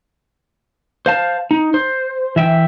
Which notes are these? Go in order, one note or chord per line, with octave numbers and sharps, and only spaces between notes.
C5 F5 A5
D#4
C5
E3 E5 G5